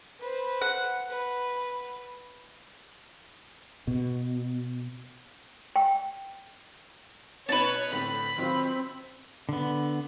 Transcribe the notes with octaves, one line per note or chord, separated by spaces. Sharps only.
B4 C5
F#5
B4
B2
G5
B2 D#4 B4 C#5 A5 F#7
A2 D3 C4 B5
D#3 F#3 C4 F4
D3 B3